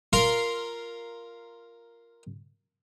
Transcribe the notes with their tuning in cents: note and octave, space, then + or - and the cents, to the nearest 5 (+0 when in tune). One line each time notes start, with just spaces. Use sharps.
F4 -5 A#4 +0 C6 +0